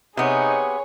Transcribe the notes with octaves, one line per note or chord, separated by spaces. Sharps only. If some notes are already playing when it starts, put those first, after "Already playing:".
C3 B3 D#4 G#4 C#5